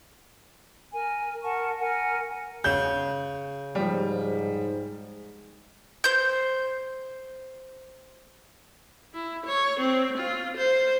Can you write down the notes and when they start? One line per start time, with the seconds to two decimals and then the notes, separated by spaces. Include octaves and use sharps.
0.92 A#4 G#5
1.44 A#4 F#5 A5 C#6
1.79 A#4 F#5 G#5
2.64 C#3 G6
3.75 G#2 F3 G3
6.04 C5 G6
9.14 E4
9.46 C#5
9.80 C4
10.18 F4
10.57 C5